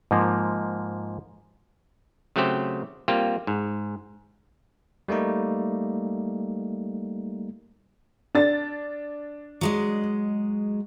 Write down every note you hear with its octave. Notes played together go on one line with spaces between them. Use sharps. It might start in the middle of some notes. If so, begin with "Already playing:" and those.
G#2 F3 A#3
C#3 F#3 A3 C4 G4 C5
G3 A#3 C4 F4 G4
G#2
G3 A3 A#3 D#4
D4 A6
F#3 G#3 D#5